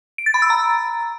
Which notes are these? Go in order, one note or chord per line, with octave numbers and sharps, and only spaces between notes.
D7
A6
B5
E6
A#5